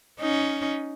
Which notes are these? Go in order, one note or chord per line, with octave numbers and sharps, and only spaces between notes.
C#4 D#4